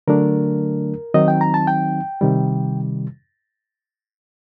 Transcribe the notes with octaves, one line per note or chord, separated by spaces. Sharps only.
D3 F#3 A3 D4 A#4
D#3 F#3 C4 D#4 D#5
G5
A#5
A5
G5
C3 D#3 G3